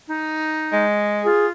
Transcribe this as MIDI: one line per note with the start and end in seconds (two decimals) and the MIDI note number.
0.08 0.85 63
0.73 1.25 56
1.25 1.51 65
1.25 1.46 68